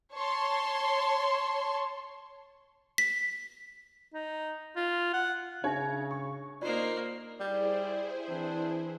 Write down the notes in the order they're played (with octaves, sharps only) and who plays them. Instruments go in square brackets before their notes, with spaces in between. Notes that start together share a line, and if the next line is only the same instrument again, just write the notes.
[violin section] C#5 A5 C6
[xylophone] B6
[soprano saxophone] D#4
F4
F#5
[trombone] C#3 [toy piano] D4 D#4 E5 [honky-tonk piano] C#5
[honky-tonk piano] C#6
[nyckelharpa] A#3 C5 [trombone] D#4 [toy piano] F4 D5
[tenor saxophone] G3 [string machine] E4 G#4 C5 [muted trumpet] D5
[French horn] E3 [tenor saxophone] C4 [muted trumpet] D4